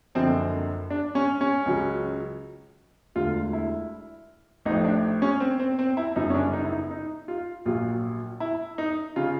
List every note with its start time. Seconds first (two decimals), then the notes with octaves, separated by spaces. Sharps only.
0.15 F#1 F#2 D3 F3 C4
0.90 D4
1.15 C#4
1.41 C#4
1.66 C#2 C#3 F#3
3.15 E1 D2 D3 F4
3.53 E4
4.65 A1 A2 F3 D#4
4.84 D4
5.22 C#4
5.40 C4
5.59 C4
5.79 C4
5.97 E4
6.16 G1 F#2 C#3 D#4
6.30 C#4
6.34 D4
6.53 D#4
6.65 E4
6.72 D#4
6.91 D#4
7.28 F4
7.65 A#1 A#2 F#3 F4
8.40 E4
8.78 D#4
9.16 C#3 F4